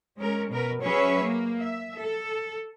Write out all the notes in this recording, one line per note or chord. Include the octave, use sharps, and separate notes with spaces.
G#3 C#4 A#4
B2 A#4 B4
F#3 C#4 G#4 B4 C#5 E5
A#3
E5
A4